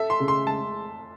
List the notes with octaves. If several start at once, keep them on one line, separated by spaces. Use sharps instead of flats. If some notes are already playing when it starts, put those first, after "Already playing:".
Already playing: A4 E5
C6
C#3
C6
G#3 A5